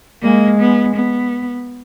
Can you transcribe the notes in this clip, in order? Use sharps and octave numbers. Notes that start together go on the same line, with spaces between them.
G#3 A#3
B3
B3